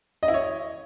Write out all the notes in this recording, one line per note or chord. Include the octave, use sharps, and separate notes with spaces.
D#5
E4
C#5